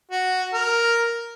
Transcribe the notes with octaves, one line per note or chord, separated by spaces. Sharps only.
F#4
A#4